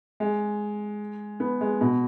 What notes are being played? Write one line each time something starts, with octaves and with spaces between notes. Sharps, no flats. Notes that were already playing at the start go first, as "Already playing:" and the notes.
G#3
B3
G#3
B2